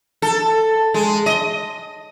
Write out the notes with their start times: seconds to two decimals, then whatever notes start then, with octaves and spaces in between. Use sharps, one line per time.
0.22 A4
0.94 G#3
1.26 D#5